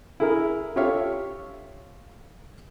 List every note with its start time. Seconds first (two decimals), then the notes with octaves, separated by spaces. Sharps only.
0.20 E4 G#4 A#4
0.76 F4 G4 A4 C#5 E5 F5